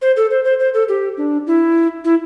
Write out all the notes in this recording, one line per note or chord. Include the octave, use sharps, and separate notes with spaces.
C5
A4
C5
C5
C5
A4
G4
D4
E4
E4